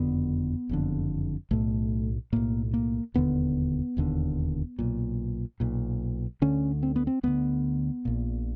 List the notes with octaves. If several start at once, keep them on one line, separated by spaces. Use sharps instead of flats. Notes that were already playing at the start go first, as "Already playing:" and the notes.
Already playing: F#1 F2 D3 B3
F#1 F2 D3
B1 A2 A3
B1 A2 A#3
A#3
E1 D#2 D3 B3
E1 D#2 D3
B1 A#2
B1 A#2
D2 D3 C#4
C4
B3
C4
D2 D3 B3
A#1 A#2